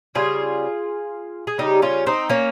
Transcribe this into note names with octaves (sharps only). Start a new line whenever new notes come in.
C#3 G3 F4 G#4
G#4
C#3 G3 D#4 G4
C#4 F4
C4 D#4
A#3 C#4